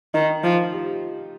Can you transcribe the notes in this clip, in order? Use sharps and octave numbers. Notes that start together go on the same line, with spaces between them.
D#3 D#4
F3 F4
G4